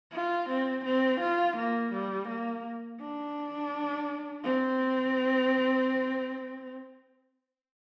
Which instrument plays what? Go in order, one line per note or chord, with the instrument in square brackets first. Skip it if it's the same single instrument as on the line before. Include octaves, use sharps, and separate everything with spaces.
[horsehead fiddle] F4
C4
C4
F4
A#3
G3
A#3
D4
C4